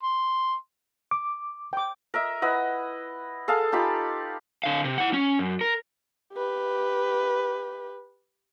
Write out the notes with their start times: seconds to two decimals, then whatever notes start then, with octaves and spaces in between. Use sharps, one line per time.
0.03 C6
1.11 D6
1.73 G5 D6
2.14 A#4 D#5 E5
2.42 E4 B4 D#5 F#5
3.48 G#4 A4 F5
3.72 D#4 F4 G4 B5
4.64 D3 F5
4.84 C3
4.98 E4 F#5
5.13 C#4
5.39 F#2
5.61 A#4
6.34 G4 B4